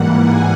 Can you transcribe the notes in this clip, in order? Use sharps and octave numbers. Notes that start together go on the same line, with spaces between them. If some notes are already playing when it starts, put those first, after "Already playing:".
Already playing: G#2 E3 G3 A#3 F#5
G#5